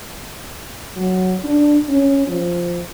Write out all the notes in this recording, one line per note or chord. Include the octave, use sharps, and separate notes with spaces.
F#3
D4
C#4
F3